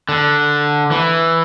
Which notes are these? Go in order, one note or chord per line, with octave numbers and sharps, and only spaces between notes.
D3
E3